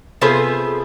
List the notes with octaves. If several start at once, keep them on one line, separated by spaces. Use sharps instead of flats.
C3 B3 F4 G#4 A4 C5